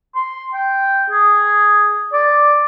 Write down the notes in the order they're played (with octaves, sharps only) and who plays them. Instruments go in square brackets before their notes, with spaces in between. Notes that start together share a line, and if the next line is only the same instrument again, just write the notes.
[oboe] C6
G5
G#4
D5